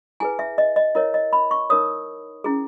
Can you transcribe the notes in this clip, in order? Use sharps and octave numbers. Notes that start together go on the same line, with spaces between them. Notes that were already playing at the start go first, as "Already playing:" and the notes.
E4 G#4 B4 G#5
E5
D#5
D#5
E4 A#4 C#5 D#5
D#5
B5
C#6
D#4 A#4 C#5 D#6
C#4 E4 G#4